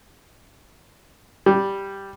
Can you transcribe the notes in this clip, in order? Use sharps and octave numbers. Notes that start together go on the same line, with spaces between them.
G3